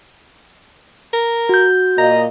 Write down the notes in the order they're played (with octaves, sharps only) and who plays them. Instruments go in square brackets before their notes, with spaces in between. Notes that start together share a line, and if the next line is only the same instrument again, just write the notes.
[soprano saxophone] A#4
[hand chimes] F#4 G6
[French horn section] A#2 A#3 D#5 [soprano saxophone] A#5